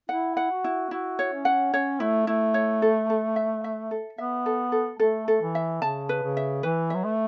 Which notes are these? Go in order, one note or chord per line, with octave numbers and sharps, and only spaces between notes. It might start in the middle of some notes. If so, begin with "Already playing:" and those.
E4 F#5
F#5
F#4
E4
E4 F#4
C#5
C#4
F#5
C#4 C#5
A3 E4
A3 E4
C#5
A4
A4
E5
E5
A4
B3 E5
A4
A4
A3 A4
A4
E3
E5
C#3 A5
B4
C#3
E5
E3 B4
F#3 E5
A3